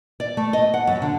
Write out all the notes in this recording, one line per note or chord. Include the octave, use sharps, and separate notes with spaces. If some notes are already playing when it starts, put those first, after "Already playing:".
D5
A3
D#5
F#5
F#2
D3